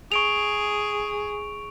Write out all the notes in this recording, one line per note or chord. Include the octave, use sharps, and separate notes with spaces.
G#4 C#6 D7 F7